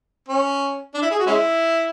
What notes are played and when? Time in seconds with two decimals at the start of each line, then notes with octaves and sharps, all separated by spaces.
0.28 C#4
0.94 D4
1.02 E4
1.11 G#4
1.19 F#4
1.26 G#3 C#4 E4